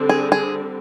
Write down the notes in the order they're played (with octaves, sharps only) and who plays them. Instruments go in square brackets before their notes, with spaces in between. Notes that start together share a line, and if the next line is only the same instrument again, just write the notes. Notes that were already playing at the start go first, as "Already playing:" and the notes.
Already playing: [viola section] D3 G3 C4
[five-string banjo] G#4
G#4